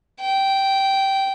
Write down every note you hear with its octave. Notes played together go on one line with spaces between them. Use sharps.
G5